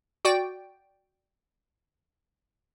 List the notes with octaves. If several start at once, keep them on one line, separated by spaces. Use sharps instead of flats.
F#4 D5 G5